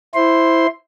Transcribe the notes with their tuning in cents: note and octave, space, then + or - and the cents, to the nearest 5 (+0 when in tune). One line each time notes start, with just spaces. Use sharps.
E4 +0 C5 +0 C6 +0